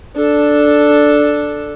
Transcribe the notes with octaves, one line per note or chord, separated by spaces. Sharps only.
D4 A4